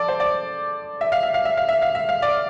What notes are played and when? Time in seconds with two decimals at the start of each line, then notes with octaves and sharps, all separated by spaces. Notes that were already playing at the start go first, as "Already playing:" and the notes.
Already playing: F3 A4 D5
0.08 C5
0.20 D5
1.01 E5
1.12 F5
1.23 E5
1.34 F5
1.45 E5
1.57 F5
1.69 E5
1.82 F5
1.95 E5
2.09 F5
2.22 D5